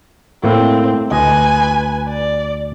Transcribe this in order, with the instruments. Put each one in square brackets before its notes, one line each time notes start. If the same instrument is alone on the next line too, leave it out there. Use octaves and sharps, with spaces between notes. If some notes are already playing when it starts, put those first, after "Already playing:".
[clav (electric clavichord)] A2 A#3 E4 [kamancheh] C4
[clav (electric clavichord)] D2 D#5 [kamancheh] B4 G#5
[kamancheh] D5